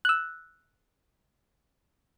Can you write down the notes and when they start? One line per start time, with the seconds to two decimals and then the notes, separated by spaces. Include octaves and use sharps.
0.05 E6 F#6